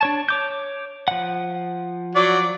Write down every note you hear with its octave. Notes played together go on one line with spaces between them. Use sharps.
D4 C#5 A5
C#5 D6 G6
F3 F#5
F#3 D5